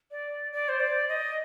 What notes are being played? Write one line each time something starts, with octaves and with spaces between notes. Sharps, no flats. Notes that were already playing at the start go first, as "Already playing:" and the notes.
D5
D5
C5
D5
D#5